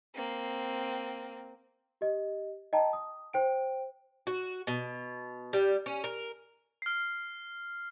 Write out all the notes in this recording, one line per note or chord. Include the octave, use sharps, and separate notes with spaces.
A#3 C4
G4 D#5
D#5 G5 A5 A#5
D#6
C5 G5 D7
F#4
B2
G3
C#4
A#4
F6 C7